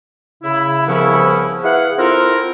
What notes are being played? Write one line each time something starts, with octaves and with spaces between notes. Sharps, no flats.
C#3 E4
C2 C#3 F3 B3 C#4 E4
E4 G#4 B4 F5 F#5
C4 E4 F4 A4 A#4